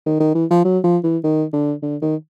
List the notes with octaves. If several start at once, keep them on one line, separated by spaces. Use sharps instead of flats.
D#3
D#3
E3
F3
F#3
F3
E3
D#3
D3
D3
D#3